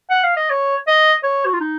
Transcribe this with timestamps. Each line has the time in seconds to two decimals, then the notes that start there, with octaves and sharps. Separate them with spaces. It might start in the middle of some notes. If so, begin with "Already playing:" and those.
0.10 F#5
0.23 F5
0.36 D#5
0.50 C#5
0.87 D#5
1.23 C#5
1.46 F#4
1.53 F4
1.60 D#4